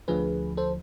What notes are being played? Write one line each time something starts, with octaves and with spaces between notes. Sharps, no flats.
D2 D3 F3 G#4 B4
A4 C5